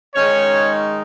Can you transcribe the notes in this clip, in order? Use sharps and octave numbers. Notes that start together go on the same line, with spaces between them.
D#3 G#3 C#4 D#4 C#5